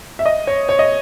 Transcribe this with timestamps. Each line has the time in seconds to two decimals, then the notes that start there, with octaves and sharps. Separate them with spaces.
0.19 E5
0.26 D#5
0.47 C#5
0.69 C#5
0.79 D#5